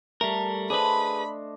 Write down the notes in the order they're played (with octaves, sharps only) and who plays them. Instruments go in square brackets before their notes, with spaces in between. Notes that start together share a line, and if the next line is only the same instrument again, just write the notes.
[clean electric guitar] G3 A#4 [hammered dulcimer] A3
[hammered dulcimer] D4 C5 D#5 [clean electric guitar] G#4 B4 [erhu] B5